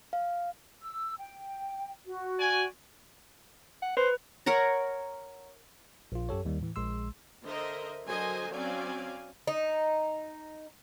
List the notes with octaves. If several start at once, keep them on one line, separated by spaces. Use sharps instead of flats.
F5
E6
G5
F#4
D5 G#5
F#5
B4 C5
A#4 C#5 F#5 A#5
A#1 F4
F#2 G4 A4 C#5
D#2 D#3 G3
A2 E3
A#1 G#3 C6 E6
D3 A#4 C5 D#5 E5
D3 F#3 A#4 C5 D#5 G#5
F#3 C4 C#4 D5 F5 G#5
D#4